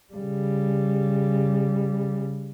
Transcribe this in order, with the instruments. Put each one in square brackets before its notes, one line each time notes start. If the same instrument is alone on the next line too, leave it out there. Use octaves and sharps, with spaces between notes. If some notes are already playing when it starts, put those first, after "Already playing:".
[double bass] C#3 G3